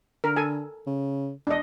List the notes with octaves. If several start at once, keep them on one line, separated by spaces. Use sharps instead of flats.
D3 A#4
A4 G#5
C#3
E1 D4 D#5